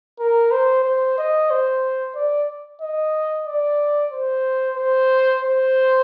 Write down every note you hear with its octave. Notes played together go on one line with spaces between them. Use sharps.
A#4
C5
C5
D#5
C5
D5
D#5
D5
C5
C5
C5